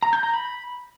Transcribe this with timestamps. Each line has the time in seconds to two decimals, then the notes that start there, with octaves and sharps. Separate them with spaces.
0.03 A#5
0.13 G6
0.23 A#5
0.33 B5